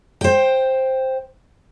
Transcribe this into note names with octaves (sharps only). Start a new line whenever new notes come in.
C5 G5